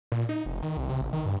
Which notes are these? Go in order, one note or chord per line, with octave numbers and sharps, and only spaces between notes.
A#2
D#4
F1
D#3
C2
C3
A1
D#3
G2